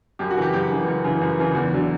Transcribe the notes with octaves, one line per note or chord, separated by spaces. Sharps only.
F#2 G4
F#4
C#3 E3 G4
F#2 G4
C#3 E3
F#2
C#3 E3
F#2
C#3 E3
E2
D3 F#3